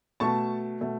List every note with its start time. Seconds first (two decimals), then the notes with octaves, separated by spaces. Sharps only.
0.20 B2 A3 A5 C#6
0.81 B2 A3